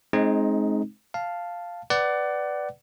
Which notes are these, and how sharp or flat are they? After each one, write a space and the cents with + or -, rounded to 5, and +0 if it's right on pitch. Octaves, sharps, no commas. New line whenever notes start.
G#3 +30 C4 +20 D#4 +0
F5 +0 A5 +0
B4 +0 D5 +0 F#5 +25